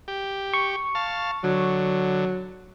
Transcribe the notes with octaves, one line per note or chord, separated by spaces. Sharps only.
G4
C#6
F5 A5
D3 F#3